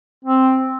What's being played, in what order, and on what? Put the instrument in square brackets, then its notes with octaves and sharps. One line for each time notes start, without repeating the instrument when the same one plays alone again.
[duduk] C4